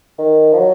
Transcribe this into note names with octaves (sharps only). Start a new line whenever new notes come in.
D#3
F3
F#3